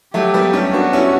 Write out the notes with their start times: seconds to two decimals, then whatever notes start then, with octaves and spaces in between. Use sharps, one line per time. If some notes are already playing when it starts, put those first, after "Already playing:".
0.14 F#3 A3 G4
0.34 G3 B3
0.53 A3 C#4
0.73 B3 D4 F#4
0.93 C#4 E4